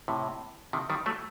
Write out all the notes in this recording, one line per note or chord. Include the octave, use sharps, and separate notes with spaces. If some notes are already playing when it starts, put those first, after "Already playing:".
A2 C3
C3 D#3
D#3 G3
F#3 A3